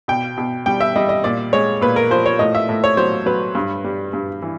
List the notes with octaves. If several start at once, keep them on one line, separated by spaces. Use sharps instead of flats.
B2 G5
B2
G3 G5
E5
G3 D#5
D#5
A#2 D5
G#3 C#5
A#2 B4
A#4
F3 C5
C#5
A2 D#5
E5
A2
C#5
F#3 C5
F#3 B4
G2
G3
G2
E3